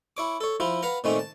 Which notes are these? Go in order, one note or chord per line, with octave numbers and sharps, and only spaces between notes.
E4 C#5 D6
A4 C#5
F3 E4 F4
B4 F5 F#5 A#5
A#2 D#3 A3 C4 C#4 D#4
A5